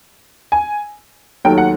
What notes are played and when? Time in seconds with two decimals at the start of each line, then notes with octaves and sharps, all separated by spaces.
0.52 G#5
1.44 D#2 D#3 F#3 A3 G5
1.58 F#5